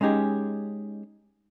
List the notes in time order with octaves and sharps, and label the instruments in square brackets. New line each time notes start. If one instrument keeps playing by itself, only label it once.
[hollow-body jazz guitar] G#3 C#4 D#4 G4 G#4